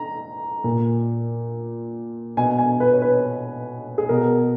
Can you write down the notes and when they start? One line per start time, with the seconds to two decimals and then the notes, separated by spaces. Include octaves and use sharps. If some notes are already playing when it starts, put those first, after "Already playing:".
Already playing: A#5
0.64 A#2
2.37 B2 G#5
2.58 G#5
2.80 B4
2.93 C#5
3.02 B4
3.98 G#4
4.09 B2 A#4